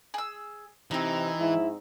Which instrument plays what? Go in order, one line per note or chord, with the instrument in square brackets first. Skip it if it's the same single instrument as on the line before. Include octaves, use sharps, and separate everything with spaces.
[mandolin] G#4 E6
[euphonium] C3 [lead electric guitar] E3 [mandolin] C4 D#4
[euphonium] G#2 [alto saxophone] E4